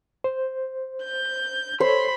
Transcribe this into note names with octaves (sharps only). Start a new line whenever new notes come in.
C5
G6
A4 C5 C#5 B5 C6